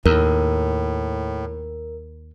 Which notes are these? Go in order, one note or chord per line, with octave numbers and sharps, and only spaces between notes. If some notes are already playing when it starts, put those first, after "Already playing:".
D#2 A2 A#4